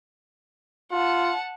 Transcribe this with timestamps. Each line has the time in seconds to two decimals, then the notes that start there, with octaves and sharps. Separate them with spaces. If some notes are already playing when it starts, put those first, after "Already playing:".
0.92 F4 F#5 A5